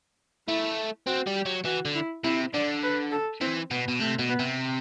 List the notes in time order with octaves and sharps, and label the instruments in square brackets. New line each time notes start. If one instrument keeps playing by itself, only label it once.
[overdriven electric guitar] A3 [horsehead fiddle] E4
[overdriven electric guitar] C4 [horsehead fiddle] F#4
[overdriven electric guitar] G3
[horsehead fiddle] G4
[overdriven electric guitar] F#3
[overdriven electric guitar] E3 [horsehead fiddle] F#4
[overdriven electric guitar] D3
[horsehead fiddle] E4
[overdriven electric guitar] C3 [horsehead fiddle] E4
[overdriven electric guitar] D3 [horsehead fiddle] D5
[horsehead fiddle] B4
A4
[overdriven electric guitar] E3 [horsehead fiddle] C4
[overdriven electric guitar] B2 [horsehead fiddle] B3
[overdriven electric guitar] B2
[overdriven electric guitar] C3 [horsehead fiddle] A3
[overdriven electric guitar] B2
[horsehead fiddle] B3
[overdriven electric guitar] C3